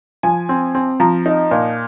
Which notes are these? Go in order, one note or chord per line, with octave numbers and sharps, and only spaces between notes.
F3 G#5
C4
C4
F3 A#5
D#4
A#2